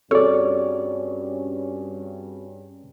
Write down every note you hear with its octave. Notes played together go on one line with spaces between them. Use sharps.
G2 C4 C#4 F#4 G#4 A4 C#5 D5